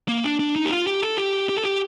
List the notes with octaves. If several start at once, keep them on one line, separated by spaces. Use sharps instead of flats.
A#3
D4
D4
D#4
G4
F4
G4
A4
G4
G4
A4
G4